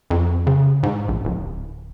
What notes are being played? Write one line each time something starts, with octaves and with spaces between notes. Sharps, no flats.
F2
C#3
G#2
A#1
D1